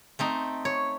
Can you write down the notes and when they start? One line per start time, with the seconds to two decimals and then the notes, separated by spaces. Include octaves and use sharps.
0.19 A3 C4 D#4
0.65 C#5